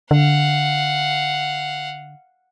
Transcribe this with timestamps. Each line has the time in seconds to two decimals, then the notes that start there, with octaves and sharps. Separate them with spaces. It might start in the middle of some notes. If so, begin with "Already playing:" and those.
0.11 D3 F5 F#5